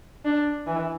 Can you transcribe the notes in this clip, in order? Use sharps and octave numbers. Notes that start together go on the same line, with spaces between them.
D4
E3